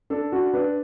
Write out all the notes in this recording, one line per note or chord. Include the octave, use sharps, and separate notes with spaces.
D4 A4
D4 F#4
D4 B4